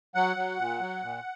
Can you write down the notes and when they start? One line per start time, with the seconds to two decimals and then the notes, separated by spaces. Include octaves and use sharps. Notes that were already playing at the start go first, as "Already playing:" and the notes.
0.15 F#3 F#5
0.36 F#3
0.59 A#2
0.80 F#3
1.03 A#2